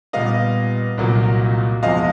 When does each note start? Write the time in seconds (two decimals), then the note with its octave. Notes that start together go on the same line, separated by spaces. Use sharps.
0.13 A#2 G3 B3 D#5 F5
0.98 C2 A#2 F#3 A#3
1.82 E2 C3 F3 G#3 D#5 F5